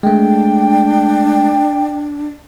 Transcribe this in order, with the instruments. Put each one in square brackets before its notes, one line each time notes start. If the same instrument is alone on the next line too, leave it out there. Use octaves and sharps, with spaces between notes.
[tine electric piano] G#3 A3 [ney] D4 [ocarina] G5